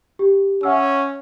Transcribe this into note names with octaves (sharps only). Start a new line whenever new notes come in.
G4
C#4 E5 F#5 E6